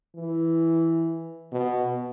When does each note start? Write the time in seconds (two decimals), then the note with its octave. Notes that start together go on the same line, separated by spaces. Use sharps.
0.15 E3
1.52 B2